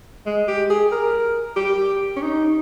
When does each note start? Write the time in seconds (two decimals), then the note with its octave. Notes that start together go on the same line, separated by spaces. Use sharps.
0.26 G#3
0.48 G4
0.70 G#4
0.92 A#4
1.56 G4
2.16 C#4
2.22 D#4